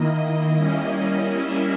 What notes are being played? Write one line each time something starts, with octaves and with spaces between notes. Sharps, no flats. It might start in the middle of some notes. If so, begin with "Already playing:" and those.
Already playing: D#3 A#3 E4 D#5
G3 A#3 C#4 E4
E5